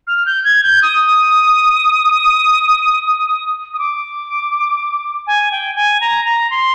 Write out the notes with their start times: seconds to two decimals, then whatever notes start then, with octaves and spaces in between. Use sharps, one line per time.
0.07 F6
0.26 G6
0.44 G#6
0.64 G6
0.82 D#6
3.74 D#6
3.79 D6
5.27 G#5
5.51 G5
5.75 G#5
6.01 A#5
6.25 A#5
6.50 C6